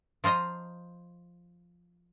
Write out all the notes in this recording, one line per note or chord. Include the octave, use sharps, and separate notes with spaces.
F3 F4 C5 D#5 A#5